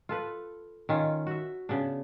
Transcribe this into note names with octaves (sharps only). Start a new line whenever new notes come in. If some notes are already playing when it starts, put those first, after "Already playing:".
F4 A4 B4
D#3 C#4 F4
F#4 E5
C#3 B3 D4